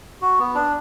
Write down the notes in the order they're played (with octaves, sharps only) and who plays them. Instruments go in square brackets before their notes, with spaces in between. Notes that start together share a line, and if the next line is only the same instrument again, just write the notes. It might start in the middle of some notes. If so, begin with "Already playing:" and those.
[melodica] F#4
B3
D4